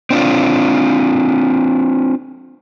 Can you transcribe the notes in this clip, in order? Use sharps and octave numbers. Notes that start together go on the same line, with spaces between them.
C4 D4 F4